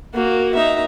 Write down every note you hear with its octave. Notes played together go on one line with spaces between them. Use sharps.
A#3 F#4
D#4 E5